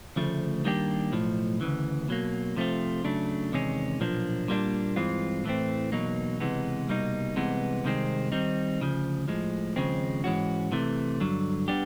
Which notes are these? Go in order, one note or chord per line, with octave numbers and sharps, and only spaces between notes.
D2 C#3 F3 A3
D#3 G3 A#3 D4 G4
B1 A2 F3
D2 C#3 E3
B2 F#3 A#3
C3 F3 A3 C4 F4
C#3 F#3 A3 D4
E2 C3 D#3 G#3 C#4
B1 A#2 F3 A#3 D4
A#2 G3 A#3 D4
G2 E3 G#3 C4 F4
A2 E3 A3 C4
E2 B2 F#3 A#3 D#4
C#2 C3 E3 G#3 B3
C2 B2 G3 A#3 D#4
C2 C3 E3 G#3 B3
C2 C3 D#3 G#3 C4
D#3 G3 C4 D#4
D2 C#3 F3
A2 F3 G#3
D#2 C#3 F3 G#3 C4
G#2 E3 G#3 C#4 F#4
C3 E3 A3
G2 D3 F#3
G3 B3 D4 G4